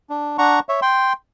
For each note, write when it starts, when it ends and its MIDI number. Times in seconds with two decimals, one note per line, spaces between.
0.10 0.37 62
0.38 0.59 62
0.38 0.59 78
0.38 0.59 82
0.38 0.59 85
0.69 0.80 73
0.69 0.80 76
0.82 1.13 79
0.82 1.13 84